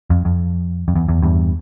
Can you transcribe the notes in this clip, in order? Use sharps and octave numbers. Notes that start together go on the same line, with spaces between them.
F2
F2
F2
E2
E2
E2 G2